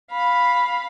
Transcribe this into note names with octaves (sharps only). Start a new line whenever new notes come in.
F5 B5